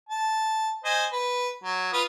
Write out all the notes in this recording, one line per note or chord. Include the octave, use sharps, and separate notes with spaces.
A5
C5 D#5 G#5
B4
F#3
F4 B4 D#6